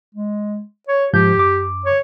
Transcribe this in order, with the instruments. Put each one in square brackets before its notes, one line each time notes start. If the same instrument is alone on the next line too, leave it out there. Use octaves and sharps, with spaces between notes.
[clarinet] G#3
C#5
[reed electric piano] G#2 F3 G6 [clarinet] G4
[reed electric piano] F#2 D6
[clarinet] C#5